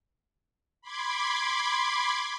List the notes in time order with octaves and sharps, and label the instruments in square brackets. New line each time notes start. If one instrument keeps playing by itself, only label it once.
[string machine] B5 C6 D6 G#6